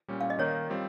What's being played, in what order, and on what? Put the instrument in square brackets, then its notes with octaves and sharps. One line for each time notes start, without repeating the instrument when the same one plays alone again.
[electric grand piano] A#2 G3 C#4
[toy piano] F5
D#5
[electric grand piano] D#3 A#3 D#4 [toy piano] C#5
[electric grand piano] G3 C4 F4